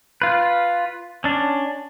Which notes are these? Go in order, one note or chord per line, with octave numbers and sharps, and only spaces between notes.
F4 B4
C#4 D4